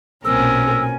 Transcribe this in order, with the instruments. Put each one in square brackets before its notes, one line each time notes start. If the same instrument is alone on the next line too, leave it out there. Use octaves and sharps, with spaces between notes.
[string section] B1 [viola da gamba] A#2 C4 A#4 [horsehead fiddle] C#4 G#5 [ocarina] E6